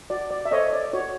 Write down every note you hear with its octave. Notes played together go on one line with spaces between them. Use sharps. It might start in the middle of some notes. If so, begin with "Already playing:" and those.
F#4 D5
D5
E5
A4 C5 C#5 D#5
D5
F#4 C#5